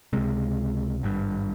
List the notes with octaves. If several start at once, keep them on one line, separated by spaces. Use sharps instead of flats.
C#2 C3 G#3
G#1 G2